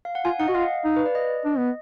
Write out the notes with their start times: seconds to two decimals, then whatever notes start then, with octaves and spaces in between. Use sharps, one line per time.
0.05 F5
0.15 F#5
0.25 F4 G#5
0.40 D#4 F#5
0.48 F#4 D#5
0.55 F4 F5
0.85 D#4
0.96 B4
1.06 D5
1.15 D#5
1.45 D4
1.58 B3